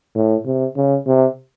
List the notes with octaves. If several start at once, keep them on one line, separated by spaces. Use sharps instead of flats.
A2
C3
C#3
C3